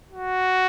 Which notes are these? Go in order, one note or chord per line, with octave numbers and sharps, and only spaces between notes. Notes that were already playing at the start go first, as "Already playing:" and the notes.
F#4